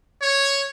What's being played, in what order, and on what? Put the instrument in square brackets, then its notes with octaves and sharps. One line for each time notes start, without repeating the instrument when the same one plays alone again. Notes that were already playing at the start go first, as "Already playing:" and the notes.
[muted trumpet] C#5